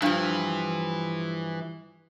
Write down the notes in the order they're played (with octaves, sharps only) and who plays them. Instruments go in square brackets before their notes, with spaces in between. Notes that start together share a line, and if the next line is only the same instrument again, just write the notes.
[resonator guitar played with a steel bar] G2 F3 [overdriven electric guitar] E3